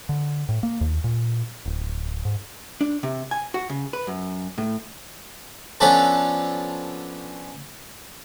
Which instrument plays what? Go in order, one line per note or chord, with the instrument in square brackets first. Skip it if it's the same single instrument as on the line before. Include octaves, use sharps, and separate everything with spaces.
[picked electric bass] D3
A2
A#3
D#2
A#2
D1
G#2
[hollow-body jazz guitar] D4
C3
G#5
F#4
C#3
B4
F#2
A2
[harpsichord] F3 B3 C#4 D4 A4 B4